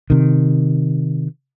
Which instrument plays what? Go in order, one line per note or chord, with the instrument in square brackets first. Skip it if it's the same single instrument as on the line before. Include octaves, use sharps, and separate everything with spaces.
[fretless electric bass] C3 D#3